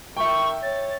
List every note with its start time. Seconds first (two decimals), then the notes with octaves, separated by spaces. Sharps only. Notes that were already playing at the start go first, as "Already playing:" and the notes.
0.17 D#3 E5 G5 C#6
0.62 C#5 A6